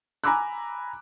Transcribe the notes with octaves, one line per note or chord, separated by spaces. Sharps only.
G#5 A#5 B5 D6 E6 F#6